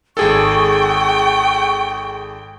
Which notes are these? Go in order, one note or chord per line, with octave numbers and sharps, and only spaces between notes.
G#1 G#4 A4 G5 C#6